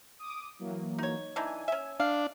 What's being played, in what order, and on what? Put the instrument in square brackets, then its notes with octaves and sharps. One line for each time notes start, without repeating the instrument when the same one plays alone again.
[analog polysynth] D6 D#6
E3 F#3 A#3
[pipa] D#4 C#5
[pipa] E3 D4 D#4 [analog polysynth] G#5
[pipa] C#4 E5
[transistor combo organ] D4 [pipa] F5